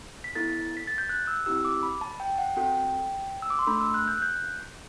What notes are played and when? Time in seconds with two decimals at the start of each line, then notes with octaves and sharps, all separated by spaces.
0.24 B6
0.35 B3 E4 A4 A6
0.77 B6
0.87 A6
0.98 G6
1.09 F#6
1.27 E6
1.46 C4 E4 G4 E6
1.65 D6
1.83 B5
2.01 A5
2.20 G5
2.38 F#5
2.57 C4 F#4 A4 G5
3.42 E6
3.50 D6
3.59 C6
3.67 A3 D4 A4 B5
3.81 E6
3.94 F#6
4.08 G6
4.17 F#6
4.22 G6